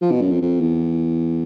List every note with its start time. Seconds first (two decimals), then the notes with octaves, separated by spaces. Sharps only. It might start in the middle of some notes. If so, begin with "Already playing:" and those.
0.02 F3
0.11 B2
0.21 F#2
0.31 F2
0.41 F2
0.60 E2